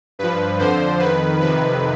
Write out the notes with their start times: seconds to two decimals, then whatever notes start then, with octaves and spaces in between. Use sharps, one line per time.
0.19 G2 F3 B4
0.59 F2 D3 F3 C5
0.99 F2 D#3 B4
1.41 F2 C3 D#3 B4